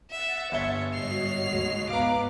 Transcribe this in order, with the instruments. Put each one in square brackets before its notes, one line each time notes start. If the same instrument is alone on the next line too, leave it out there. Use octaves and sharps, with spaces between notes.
[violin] E5 [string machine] F#5 A6
[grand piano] G1 E5 G7 [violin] C#5
[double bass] G#2 G3 [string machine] F#4 C#5 D#5 [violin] C7 F7
[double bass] D#2 G#3
[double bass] G#2 [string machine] B3 [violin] B4 D6 [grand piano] F5 A#5